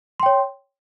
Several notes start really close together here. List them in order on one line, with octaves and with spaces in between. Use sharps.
C6 G5 C#5